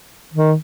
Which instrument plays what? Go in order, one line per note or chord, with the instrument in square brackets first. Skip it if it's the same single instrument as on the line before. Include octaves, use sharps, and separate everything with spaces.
[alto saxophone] D#3